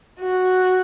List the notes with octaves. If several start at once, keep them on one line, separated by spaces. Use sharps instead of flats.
F#4